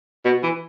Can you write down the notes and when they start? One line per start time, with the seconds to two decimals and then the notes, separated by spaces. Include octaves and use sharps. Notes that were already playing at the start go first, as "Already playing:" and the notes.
0.25 B2
0.43 E3